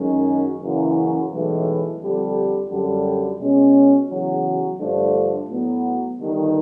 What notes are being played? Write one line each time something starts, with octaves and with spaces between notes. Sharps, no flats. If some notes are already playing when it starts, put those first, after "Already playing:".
Already playing: F#2 D#3 G#3 C#4 F#4
F#1 F#2 C#3 E3
B1 A2 E3 G#3
F2 D3 G3
F#2 D3 G3
B2 G#3 C#4
E2 C#3 F#3
G2 D3 F3 A3 D4
A2 F#3 B3
G1 G2 D#3